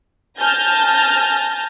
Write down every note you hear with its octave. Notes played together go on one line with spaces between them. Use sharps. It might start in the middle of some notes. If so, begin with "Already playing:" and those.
G#5 A5 F6 G6 A6 A#6